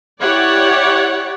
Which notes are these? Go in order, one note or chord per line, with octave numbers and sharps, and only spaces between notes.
E4 G4 C#5 D5 F#5